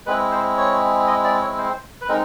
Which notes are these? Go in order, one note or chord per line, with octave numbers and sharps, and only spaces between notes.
G#3 C4 E4 B4
C5
C#5
D#5
D5
C#5
C5
B4
G#3 C4 D#4 A#4